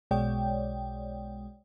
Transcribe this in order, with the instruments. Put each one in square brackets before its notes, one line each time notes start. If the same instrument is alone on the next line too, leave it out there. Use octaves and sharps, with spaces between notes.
[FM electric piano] B1 B2 G#3 C#5 D5 G5